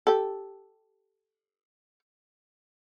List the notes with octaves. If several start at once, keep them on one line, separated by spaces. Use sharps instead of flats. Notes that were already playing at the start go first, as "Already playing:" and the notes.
G4 A4